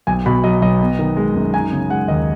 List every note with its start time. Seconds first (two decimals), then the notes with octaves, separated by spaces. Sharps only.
0.07 B1 G#5
0.26 B2 B5
0.44 F#3 D#5
0.62 B1 D#5
0.80 B3
0.99 D#3
1.17 G#3
1.35 F#2
1.54 D#4 G#5
1.72 C#3
1.90 G#3 F#5
2.08 D#2 D#5